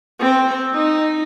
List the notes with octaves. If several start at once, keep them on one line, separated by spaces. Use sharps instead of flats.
C4
D#4